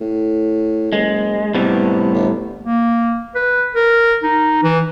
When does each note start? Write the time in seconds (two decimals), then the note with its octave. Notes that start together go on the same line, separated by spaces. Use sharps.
0.01 A2
0.92 F#1 G#3
1.54 A2 C3 G3 B3
2.14 G1
2.63 A#3
3.35 B4
3.75 A#4
4.23 D#4
4.63 E3